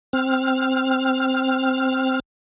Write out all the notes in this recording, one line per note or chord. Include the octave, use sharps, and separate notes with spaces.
C4 F6